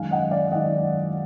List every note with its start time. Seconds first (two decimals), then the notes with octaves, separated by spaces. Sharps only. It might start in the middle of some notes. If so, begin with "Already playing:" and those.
Already playing: F#2 D#3 G#3 D#4 F5 G#5
0.11 D#5 F#5
0.31 D5 F5
0.51 F#2 D#3 G#3 D#4 D#5 F#5